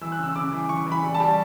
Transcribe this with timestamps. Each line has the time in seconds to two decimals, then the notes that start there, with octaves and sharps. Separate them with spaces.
0.01 E3 E6
0.12 F#6
0.19 C#3 E6
0.36 C#3 D6
0.52 E3
0.69 E3 C#6
0.86 E3
0.92 B5
1.03 G3
1.14 A5
1.20 G3